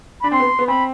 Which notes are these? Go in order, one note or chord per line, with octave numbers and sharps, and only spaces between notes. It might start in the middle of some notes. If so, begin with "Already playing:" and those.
D4 B5
C4 C6
B3
B3
C4 B5